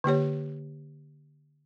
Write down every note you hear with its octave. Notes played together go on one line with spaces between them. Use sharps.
D3 A#3 G4 C#5